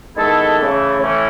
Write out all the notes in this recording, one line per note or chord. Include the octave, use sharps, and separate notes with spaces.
D#3 G#3 B3 E4 A4
C#3 E3 A3
A2 E3 A3 C#4